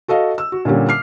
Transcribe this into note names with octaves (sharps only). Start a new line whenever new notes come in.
F#4 A4 D#5 F5
E6
F#4
A#2 D3 G3 C#4 G4
D6 F6 C7